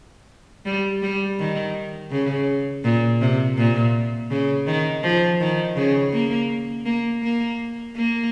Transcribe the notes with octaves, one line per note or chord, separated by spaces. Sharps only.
G3
G3
D#3
C#3
A#2
C3
A#2
C#3
D#3
F3
D#3
C#3
A#3
A#3
A#3
A#3